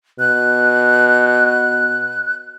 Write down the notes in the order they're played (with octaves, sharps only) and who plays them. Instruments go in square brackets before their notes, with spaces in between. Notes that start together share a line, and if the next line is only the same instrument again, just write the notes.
[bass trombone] B2 [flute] F#6